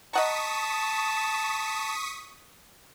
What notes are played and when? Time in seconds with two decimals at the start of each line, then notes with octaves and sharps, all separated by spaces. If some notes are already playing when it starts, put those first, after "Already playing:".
0.13 D#5 F#5 A5 A#5 C#6 D#6 B6